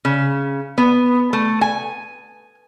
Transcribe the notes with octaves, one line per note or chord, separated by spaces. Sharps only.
C#3
B3
A3
G#5